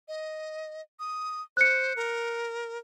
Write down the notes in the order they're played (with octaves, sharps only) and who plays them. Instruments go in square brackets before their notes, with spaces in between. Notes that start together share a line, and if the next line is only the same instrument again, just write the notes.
[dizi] D#5
D#6
[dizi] C5 [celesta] F#6 C#7
[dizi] A#4